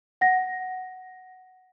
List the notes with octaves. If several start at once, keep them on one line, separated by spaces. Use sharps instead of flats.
F#5 A#6